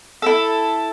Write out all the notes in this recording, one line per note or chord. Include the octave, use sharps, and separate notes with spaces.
E4 A4